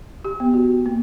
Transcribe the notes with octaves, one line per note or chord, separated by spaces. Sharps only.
G4
B3
F#4
A#3